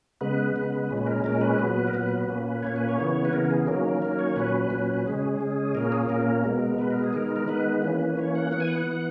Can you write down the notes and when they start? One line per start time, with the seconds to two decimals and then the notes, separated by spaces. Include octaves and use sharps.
0.21 C#3 G#3 B3 B4
0.56 C#3 G#3 B3
0.90 A#2 G#3 C#4
0.97 B4
1.07 A#4
1.24 A#2 G#3 C#4 A#4
1.41 B4
1.59 A#2 F#3 B3
1.87 A#4
1.93 A#2 F#3 B3 B4
2.28 A#2 A#3 C#4
2.62 A#2 A#3 C#4 C#5
2.76 B4
2.89 C#5
2.98 C#3 E3 B3
3.25 B4
3.33 C#3 E3 B3 A#4
3.46 A#4
3.50 G#4
3.67 D#3 F#3 A#3 C#4 A#4
3.84 A#4
4.02 D#3 F#3 A#3 C#4 A#4
4.19 C#5
4.36 A#2 F#3 C#4 B4
4.70 A#2 F#3 C#4
5.06 C#3 G#3 C#4 G#4
5.40 C#3 G#3 C#4
5.75 A#2 A#3 C#4 A#4
5.92 G#4
6.09 A#2 A#3 C#4 A#4
6.44 B2 G#3 B3
6.78 B2 G#3 B3 B4
6.91 A#4
7.04 G#4
7.13 D#3 G#3 B3 A#4
7.36 A#4
7.47 D#3 G#3 B3 B4
7.82 E3 A#3 C#4
8.17 E3 A#3 C#4 C#5
8.35 F#5
8.51 E3 B3 F#5
8.60 G#5
8.68 F#5
8.86 E3 B3